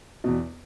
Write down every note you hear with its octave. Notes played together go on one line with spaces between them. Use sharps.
E2 B2